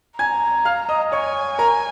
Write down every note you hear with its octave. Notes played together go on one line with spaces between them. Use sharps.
G#5 A#5 G#6
F5 F6
D#5 D#6
C#5 G#5 C#6
A#4 A#5